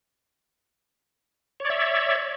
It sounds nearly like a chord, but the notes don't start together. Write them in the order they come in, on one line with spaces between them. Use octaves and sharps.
C#5 D5 E5